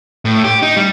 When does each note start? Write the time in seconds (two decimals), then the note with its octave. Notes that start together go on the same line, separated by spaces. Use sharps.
0.25 A2
0.44 G4
0.62 D#4
0.77 G3